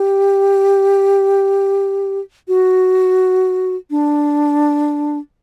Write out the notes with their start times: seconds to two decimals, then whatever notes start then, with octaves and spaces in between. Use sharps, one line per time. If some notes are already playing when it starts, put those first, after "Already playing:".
Already playing: G4
2.48 F#4
3.90 D4